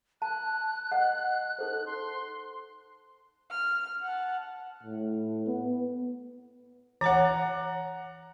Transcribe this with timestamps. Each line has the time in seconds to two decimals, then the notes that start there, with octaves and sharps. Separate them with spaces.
0.22 A5 F#6
0.92 D#5 F#5
1.59 D#4 A4 C5
1.86 C6
3.51 F6
4.03 F#5 A5
4.83 A2
5.46 B3
7.01 E3 C#5 F#5 A#5